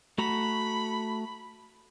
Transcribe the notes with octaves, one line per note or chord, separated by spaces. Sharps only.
A3 F#4 A#5 B5